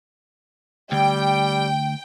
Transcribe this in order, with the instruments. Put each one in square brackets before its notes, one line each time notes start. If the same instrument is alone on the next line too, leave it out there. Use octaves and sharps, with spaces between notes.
[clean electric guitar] D2 [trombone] G3 [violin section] G5